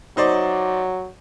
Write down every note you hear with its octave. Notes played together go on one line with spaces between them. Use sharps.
F#3 D#4 C5 D5